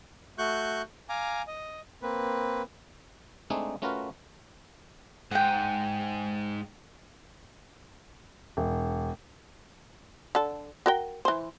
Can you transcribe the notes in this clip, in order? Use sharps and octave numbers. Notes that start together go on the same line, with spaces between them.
A3 F#4 C#6 F#6 G6
F5 G#5 A#5 D6
D#5
A#3 C4 B4
G#3 A3 C4 D4 D#4 G#4
A3 C#4 F4 F#4 A#4 B4
G#2 G#4 F#5 G5
E1
D3 A4
F#4 A#4 G5
E3 C5